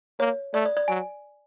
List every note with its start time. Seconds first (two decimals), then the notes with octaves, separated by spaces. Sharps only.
0.19 A#3 C#5
0.53 A3 D5
0.65 D5
0.77 D5
0.88 F#3 G#5